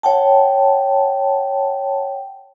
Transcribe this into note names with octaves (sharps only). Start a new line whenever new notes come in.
C#5 F#5 G5 A5